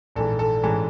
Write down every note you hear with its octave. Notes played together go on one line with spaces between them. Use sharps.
A#1 G#2 E3 A4
A4
A1 G#2 E3 G#3 A4